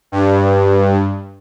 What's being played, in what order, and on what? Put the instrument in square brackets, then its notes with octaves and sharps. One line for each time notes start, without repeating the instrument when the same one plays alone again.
[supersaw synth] G2